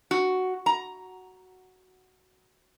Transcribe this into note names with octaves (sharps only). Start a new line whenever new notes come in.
F#4
A#5